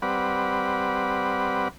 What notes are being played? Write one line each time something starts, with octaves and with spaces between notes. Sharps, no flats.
G3 C4 B4 D5 F#5